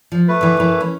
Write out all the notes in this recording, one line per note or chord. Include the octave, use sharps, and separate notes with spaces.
F3
A3 B4
D3 E3
F#2 E3
C#4